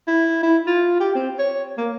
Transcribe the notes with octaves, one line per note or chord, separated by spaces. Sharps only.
E4
E4
F4
G4
C4
C#5
A#3